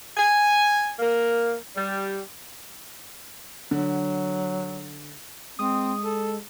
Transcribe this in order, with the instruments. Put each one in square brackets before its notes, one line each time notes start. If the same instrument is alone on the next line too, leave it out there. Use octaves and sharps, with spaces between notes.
[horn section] G#5
A#3
G3
[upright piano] D3 [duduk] F#3
[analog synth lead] G#3 [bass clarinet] C4 [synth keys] D#6
[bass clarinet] A4